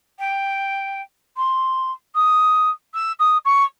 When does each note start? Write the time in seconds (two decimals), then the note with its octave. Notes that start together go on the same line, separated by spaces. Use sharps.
0.19 G5
1.37 C6
2.15 D#6
2.94 E6
3.19 D#6
3.45 C#6